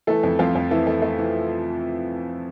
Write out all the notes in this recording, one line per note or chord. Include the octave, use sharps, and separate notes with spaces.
E3 A3 A4
F2
F2 F3 F4
F2
E3 A3 E4
A3
A3
E3